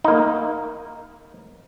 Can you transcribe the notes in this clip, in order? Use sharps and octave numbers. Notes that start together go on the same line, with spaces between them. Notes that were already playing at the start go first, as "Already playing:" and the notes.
A#3 D#4